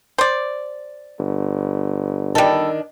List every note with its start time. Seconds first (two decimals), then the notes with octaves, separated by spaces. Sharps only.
0.18 C5 D5
1.19 G1
2.35 D#3 G3 D4 A4